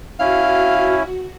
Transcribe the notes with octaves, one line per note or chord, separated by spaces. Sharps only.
C#4 E4 F#4 F5